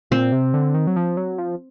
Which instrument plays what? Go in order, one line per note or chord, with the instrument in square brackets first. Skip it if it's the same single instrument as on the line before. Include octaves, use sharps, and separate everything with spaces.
[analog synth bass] A#2 [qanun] C4
[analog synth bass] C3
D3
D#3
F#3
F3
F#3
F3